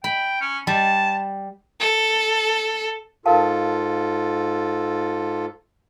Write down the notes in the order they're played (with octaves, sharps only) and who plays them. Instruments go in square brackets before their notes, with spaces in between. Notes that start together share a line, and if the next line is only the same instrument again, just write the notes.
[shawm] G5 [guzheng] B5
[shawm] C#4
[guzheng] G3 [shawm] A5
[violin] A4
[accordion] G#2 F4 A4 [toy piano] A#4 F5 A5